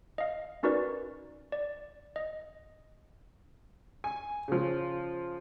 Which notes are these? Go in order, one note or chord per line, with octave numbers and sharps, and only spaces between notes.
D#5 F5
C#4 D#4 F#4 A#4 B4 D5
D5
D#5
G#5
C#3 F3